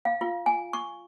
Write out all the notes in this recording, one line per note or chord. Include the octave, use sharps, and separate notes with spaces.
F5
F4
G#5
C#6